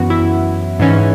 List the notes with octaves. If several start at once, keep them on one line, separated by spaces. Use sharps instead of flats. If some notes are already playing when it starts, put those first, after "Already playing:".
Already playing: F#2 E3 B3 F#4
E4
G#2 E3 C#4